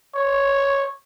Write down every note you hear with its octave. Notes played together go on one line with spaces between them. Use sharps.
C#5